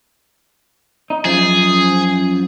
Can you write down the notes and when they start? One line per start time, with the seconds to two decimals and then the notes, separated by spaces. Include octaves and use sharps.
1.10 D#4
1.25 F#2 F3 G#4